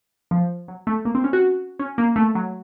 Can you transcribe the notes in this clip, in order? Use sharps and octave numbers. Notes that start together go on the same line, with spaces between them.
F3
F#3
A3
A#3
C4
C#4
F#4
C#4
A#3
A3
F#3